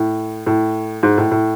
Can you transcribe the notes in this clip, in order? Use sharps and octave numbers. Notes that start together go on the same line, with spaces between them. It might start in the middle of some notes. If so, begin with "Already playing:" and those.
Already playing: A2
A2
G#2
A2
A2